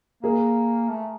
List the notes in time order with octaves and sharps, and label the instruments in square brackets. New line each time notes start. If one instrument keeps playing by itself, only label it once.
[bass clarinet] A#3 [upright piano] G#4 A#4
[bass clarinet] A3